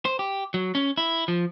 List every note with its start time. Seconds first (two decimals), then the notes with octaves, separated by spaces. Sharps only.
0.05 C5
0.19 G4
0.54 F#3
0.75 C#4
0.98 E4
1.28 F3